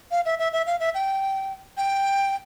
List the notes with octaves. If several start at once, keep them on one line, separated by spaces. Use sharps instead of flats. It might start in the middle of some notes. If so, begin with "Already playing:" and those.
F5
E5
E5
E5
F5
E5
G5
G5